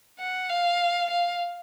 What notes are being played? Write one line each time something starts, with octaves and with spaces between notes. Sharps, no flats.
F#5
F5
F5